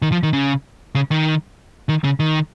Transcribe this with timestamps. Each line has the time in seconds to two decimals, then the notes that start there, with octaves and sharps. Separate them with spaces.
0.02 D#3
0.12 F3
0.23 D#3
0.33 C#3
0.95 C#3
1.11 D#3
1.89 D#3
2.04 C#3
2.20 D#3